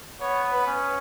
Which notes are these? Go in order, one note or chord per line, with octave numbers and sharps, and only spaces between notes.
B3 C#5
B4
C#4